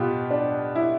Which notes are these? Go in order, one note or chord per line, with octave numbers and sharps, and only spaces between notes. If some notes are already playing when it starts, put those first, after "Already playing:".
Already playing: B2 B3 F4 G4
D4
E4